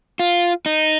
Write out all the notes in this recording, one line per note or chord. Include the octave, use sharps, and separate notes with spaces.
F4
D#4